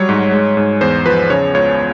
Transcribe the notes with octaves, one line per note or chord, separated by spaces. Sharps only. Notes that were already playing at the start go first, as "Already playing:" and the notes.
Already playing: F#3 G3 C#5
G#2
G#3
G#2
E2 C5
F3 B4
C#3 C#5
C#2 C#5